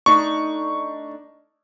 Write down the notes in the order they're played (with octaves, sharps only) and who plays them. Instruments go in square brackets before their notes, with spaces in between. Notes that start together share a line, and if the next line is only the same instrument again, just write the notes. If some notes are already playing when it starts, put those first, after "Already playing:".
[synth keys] A3 D4 D#4 [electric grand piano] C#6